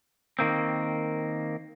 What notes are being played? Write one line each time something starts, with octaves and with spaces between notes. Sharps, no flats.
D#3 A#3 C4